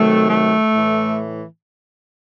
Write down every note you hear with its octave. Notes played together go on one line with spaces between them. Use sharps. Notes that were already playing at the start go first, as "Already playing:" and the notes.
Already playing: C3 D#3 F#3 A3
A3
A2 E3